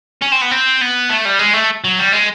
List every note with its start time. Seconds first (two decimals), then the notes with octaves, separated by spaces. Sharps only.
0.22 C#4
0.32 C4
0.41 B3
0.51 C4
0.81 B3
1.09 A3
1.25 G3
1.39 G#3
1.54 A3
1.84 F#3
1.99 G3
2.13 G#3